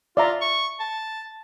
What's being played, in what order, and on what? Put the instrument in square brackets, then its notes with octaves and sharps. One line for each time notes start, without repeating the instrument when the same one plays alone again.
[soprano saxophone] F4 [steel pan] D5 E5 A#5
[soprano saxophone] C#6
A5